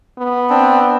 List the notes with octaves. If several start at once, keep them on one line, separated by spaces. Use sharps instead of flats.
B3
C4 D4